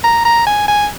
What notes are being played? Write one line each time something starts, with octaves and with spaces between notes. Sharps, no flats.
A#5
A#5
G#5
G#5